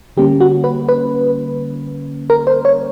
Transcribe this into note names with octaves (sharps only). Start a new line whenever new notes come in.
D3 G3 A#3 C#4 G4
F#4
B4
B4
A#4
C5
C#5